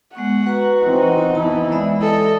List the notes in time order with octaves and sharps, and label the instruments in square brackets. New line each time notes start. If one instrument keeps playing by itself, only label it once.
[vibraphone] G#3 B3 C#6 [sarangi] F#5
[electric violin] F#4 [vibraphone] B4 A#5
[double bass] E3 C4 [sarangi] D#4
[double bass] E3 E4 [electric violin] B3 [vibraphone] A5
[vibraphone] G#3 D5 E5
[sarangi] A4 [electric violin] D#5